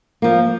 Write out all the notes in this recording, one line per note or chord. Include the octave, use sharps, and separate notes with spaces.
F3 A#3